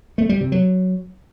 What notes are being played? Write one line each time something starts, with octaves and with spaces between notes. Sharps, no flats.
A3
G3
C3
F#3